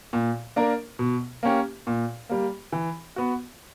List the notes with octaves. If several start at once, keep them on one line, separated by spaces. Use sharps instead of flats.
A#2
A#3 D4 A#4
B2
A#3 C#4 G4
A#2
G3 A#3
E3
B3 F#4